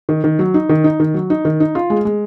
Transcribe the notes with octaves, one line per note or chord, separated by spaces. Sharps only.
D#3
D#3
F#3
D#4
D#3
D#4
D#3
F#3
D#4
D#3
D#4
F4
G#3
G#3